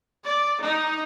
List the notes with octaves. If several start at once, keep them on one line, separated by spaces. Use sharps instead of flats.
D5
D#4